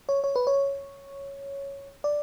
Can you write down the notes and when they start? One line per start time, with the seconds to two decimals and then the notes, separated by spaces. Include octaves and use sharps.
0.09 C#5
0.24 C#5
0.36 B4
0.47 C#5
2.04 D5